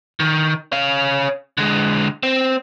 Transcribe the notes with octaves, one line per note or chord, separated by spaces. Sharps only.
D#3
C#4 F5
D3 G#3
C4